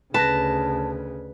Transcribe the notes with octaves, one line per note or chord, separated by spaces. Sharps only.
D2 C#3 B4 A5 A#6